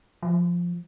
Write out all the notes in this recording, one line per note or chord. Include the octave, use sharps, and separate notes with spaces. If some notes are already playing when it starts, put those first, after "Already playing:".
F3